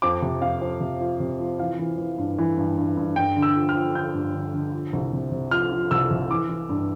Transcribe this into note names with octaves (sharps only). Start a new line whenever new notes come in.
F2 D6
C3
F2 F5
F2
C3
F3
C3
F3
E3 F5
E3
E3
G2
E3
G2
G2
G2
G2 G5
D3
E6
F3
F6
F3
D3 G6
G2
D3
D3
F3
C2
C3
C3
F3 F6
F3
C2 E6
C2
E3 D6
E3
G2